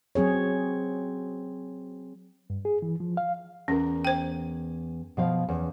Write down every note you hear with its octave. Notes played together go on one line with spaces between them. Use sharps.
F#3 C4 G#4 C#5
G2
G#4
E3
F3
F5
E2 C#4 A#4
C5 G5
B2 F3 F5
E2 C#4